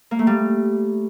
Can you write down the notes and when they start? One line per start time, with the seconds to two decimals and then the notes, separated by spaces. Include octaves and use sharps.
0.11 A#3
0.19 A3
0.27 G3